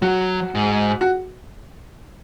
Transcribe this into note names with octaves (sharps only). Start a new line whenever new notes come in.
F#3 F#4
G#2
F#4